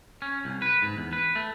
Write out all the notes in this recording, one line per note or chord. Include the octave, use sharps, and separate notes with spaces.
C#4
C2
B4
G#2
E2
B4
A3